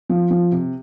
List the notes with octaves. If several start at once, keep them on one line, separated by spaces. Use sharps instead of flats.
F3
F3
C3